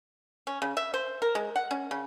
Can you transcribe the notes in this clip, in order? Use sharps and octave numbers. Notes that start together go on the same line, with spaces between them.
C#4
C#3
E5
C5
A#4
G#3
F#5
C#4
C#3